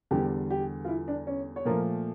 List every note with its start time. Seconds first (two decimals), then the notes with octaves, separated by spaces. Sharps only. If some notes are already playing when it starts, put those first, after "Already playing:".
0.11 E2 D3 G3 G4
0.50 G4
0.85 F4
0.88 E4
1.08 D4
1.27 C#4
1.56 C#5
1.65 A#2 F3 A3 A#4